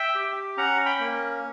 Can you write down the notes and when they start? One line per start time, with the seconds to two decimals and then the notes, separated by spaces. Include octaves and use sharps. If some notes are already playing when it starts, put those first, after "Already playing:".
Already playing: E5 G5
0.15 G4
0.57 C#4 F#5 A#5
0.86 G5 B5
1.00 A#3